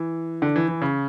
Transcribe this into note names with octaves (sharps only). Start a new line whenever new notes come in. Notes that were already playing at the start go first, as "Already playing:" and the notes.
Already playing: E3
D3
E3
E3
C#3